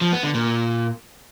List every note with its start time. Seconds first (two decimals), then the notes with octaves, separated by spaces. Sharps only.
0.01 F3
0.12 B3
0.23 D3
0.34 A#2